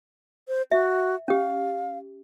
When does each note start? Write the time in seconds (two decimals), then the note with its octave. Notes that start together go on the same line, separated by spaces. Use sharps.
0.48 C5
0.72 F#4 E5
1.28 C#4 G4 F5